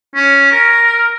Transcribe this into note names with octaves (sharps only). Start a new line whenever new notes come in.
C#4
A#4